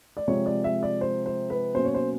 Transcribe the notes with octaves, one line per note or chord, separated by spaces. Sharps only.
D5
C3 F3 G#3 C4 C#5
D5
E5
D5
C5
C5
B4
B2 F#3 A#3 C#4 C5
C#5
C5